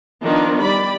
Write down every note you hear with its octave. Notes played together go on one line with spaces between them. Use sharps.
D#3 F3 B3 D4 D#4
G3 D5 B5